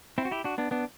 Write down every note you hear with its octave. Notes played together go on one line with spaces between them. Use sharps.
C4 E4
F#4
E4 G4
D4 F#4
B3 D4
B3 D4